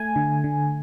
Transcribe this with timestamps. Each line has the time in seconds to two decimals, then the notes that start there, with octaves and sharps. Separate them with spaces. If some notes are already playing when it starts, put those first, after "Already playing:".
Already playing: A3 G#5
0.16 D3
0.44 D3